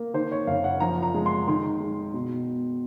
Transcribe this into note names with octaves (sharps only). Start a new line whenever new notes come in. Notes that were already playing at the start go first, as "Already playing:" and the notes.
Already playing: A#3
D#3 C5
C#5
F#1 F5
F#5
F3 A#5
A#5
G#3
C6
D#3 C6
G#3
B2